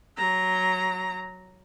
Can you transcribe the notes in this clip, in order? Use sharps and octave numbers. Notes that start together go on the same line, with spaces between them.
F#3 A#5